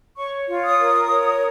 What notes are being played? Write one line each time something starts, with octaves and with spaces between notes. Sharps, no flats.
C#5 C#6
F4
D#6
A#4
C#5